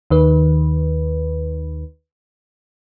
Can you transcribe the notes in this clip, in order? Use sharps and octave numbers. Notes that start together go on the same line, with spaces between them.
D#2 D#3 B4